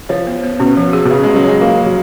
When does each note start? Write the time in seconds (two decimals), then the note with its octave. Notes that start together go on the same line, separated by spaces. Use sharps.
0.09 F3 C#5
0.27 B3
0.43 B3
0.60 B2 C#4
0.77 F3
0.93 G#4
1.05 B2
1.10 C#3 G#4
1.23 G#3
1.28 C#4
1.36 F#3
1.44 G#3 C#5
1.61 A#3 F4
1.77 F3
1.86 F#3